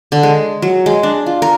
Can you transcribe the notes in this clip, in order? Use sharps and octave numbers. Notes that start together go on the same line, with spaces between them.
D3
G#3
F#3
G#3
D4
F4
A#4